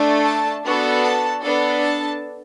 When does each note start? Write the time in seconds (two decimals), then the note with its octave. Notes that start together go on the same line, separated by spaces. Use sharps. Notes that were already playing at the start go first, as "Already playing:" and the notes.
Already playing: A3 D4 A4
0.24 A5
0.64 B3 D4 F#4 A4
1.03 A5
1.42 B3 D4 A4
1.82 A5